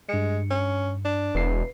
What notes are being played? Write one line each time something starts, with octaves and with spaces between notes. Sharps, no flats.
G2 G#3 C#7
C#4
D4
E1 B4 C7